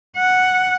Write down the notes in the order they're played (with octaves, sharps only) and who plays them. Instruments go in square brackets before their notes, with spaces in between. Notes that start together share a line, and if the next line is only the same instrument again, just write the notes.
[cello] F#5